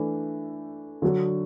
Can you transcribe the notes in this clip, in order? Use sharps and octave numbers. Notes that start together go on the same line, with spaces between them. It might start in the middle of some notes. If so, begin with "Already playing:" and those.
Already playing: E3 A3 D4
D3 F#3 D4 F#4